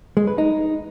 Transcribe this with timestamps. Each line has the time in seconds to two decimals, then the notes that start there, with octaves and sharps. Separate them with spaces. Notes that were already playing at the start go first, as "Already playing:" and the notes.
0.17 G#3
0.27 B4
0.38 D#4